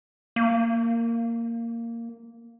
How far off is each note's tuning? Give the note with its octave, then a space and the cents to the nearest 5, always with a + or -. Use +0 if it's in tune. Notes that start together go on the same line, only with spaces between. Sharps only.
A#3 -10